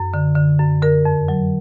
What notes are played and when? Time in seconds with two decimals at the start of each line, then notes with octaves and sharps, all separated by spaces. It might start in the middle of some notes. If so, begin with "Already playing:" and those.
Already playing: F#2
0.14 D3
0.36 D3
0.59 F#2
0.82 D3 A#4
1.05 F2
1.28 F#3